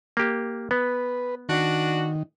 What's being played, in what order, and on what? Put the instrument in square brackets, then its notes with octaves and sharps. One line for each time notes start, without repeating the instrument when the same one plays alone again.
[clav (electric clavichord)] A#3 G4
[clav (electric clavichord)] B3 [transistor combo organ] B4
[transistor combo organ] D#3 [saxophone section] D4 F#4